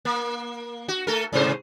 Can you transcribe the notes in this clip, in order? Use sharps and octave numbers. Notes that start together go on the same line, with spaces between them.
A#3
F#4
A3 A4 A#4
G#2 C3 C5